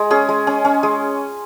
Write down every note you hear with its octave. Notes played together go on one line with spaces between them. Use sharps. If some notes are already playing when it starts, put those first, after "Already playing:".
Already playing: G#3
C#4 G#4
G#3
C#4
C#4
G#3